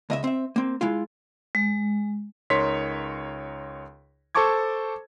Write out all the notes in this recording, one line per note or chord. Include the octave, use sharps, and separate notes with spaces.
C#2 D#5 E5
C4 E5
A#3 C4
G#3 E4 F4
G#3
C#2 D#4 A#4 C#5 C6 B6
A4 C5 A5 C#6 D6 G#6